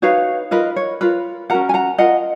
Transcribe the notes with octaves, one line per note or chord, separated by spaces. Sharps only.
D#4 F#4 B4 C#5 F5
F4 A#4 B4 D#5
C#5
F4 A#4 B4
C#4 F#4 A#4 F#5 A#5
G#5
F#5 A#5
F4 A#4 D#5 F#5